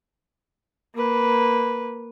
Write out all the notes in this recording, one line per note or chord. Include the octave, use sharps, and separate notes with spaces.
A#3 B4